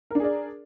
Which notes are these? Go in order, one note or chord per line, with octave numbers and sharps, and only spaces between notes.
D4 G#4 A#4 D5